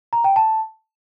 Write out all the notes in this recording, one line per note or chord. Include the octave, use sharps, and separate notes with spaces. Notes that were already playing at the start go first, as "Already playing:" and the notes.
A#5
G5
A5